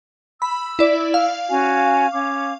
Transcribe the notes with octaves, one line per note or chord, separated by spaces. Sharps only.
B5 E6
E4 D5
F5
C#4 F#4 G#5
C#4 D6